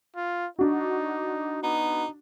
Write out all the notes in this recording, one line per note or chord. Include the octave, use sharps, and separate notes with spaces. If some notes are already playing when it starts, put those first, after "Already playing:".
F4
D4 D#4 F#4
B3 D#4